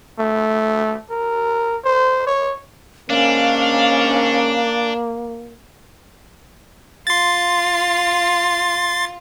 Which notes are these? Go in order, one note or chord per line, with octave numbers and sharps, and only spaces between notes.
A3
A#4
C5
C#5
G#2 D#3 A#3 C#4 D4 F5
F4 C6 A6